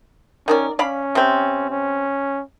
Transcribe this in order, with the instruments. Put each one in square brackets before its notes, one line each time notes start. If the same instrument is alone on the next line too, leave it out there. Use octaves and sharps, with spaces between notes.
[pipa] D#3 A#4 D5 [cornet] C#4
[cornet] C#4 [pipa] D5 F5 B5
[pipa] C3 C4
[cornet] C#4